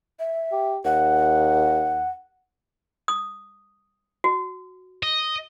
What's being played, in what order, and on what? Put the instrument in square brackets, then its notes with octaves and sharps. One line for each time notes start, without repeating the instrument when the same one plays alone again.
[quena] E5
[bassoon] G4
[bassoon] D#2 [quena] F#5
[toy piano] D#6
F#4
[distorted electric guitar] D#5